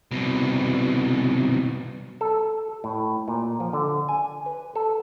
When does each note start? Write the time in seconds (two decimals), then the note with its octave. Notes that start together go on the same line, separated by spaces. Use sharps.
0.11 C2 B2
2.21 A4
2.84 A2
3.28 A#2
3.60 F3
3.73 D3
4.09 G#5
4.46 B4
4.76 A4